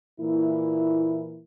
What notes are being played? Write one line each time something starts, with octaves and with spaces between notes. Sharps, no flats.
A#2 E3 A#3 E4